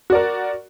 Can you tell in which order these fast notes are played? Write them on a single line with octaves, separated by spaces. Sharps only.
F#4 D5 A#4